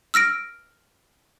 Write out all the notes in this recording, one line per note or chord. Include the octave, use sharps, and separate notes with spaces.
E6 F6 A#6 D7